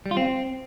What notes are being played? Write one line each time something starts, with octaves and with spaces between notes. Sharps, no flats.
G3
F4
C4